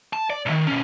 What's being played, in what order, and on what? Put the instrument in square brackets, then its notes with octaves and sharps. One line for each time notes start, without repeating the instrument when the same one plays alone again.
[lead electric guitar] A5
D5
B1 D#3
B2 C#4